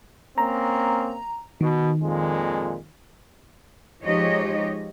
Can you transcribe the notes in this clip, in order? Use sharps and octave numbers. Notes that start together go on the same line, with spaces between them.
A#3 C4 C#4 A#5
B2 D#3
F2 A#2 G#3
F3 G#3 D#4 G4 C#5 D#5